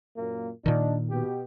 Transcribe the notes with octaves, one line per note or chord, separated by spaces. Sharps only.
F#2 A#2 A#3
A#2 D#3 D4 D#4
B2 G4